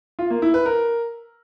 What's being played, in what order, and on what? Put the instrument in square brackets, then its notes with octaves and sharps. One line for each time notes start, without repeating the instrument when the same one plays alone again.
[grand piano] F4
A#3
E4
B4
A#4